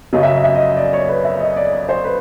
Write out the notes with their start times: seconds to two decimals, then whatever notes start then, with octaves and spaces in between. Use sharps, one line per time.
0.13 F#2 C#3 F#3 D#5
0.23 E5
0.34 D#5
0.44 E5
0.55 D#5
0.77 D5
0.93 C#5
1.08 B4
1.24 E5
1.40 D#5
1.56 D5
1.73 D5
1.89 C5
2.04 B4